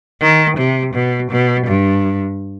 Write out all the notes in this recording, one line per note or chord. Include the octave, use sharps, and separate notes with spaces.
D#3
C3
B2
B2
G2